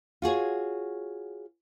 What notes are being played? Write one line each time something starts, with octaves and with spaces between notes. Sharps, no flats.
F4 F#4 G#4 C#5